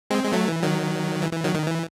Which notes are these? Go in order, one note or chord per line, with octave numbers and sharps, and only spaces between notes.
G#3 C4
G#3
F#3 A3
E3
D#3 F#3
E3
E3
D#3 F#3
D#3
E3